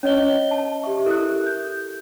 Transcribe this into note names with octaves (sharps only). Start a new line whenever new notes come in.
C#4 C#5 D#5 G7
A5
G4 E5 C#6
E4 A4 A#4 E5 F#6
G6